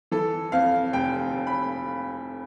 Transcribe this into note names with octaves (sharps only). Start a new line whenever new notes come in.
E3 A4
F2 F5
F1 G5
F1
B5